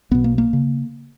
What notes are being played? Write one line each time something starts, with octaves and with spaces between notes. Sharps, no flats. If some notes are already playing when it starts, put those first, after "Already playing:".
B1 B2 B3
A#3
A#3
C#3